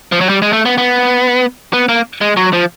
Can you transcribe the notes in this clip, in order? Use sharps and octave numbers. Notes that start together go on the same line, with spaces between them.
F3
F#3
G3
G#3
A3
B3
B3
B3
A#3
G#3
F#3
F3